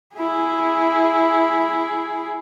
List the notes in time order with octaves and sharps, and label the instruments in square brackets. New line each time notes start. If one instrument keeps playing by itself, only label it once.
[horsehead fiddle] E4 G#4